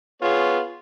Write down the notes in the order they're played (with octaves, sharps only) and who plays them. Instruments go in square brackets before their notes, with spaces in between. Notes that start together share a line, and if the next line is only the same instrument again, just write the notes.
[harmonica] B3 G#4 C#5 [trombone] F4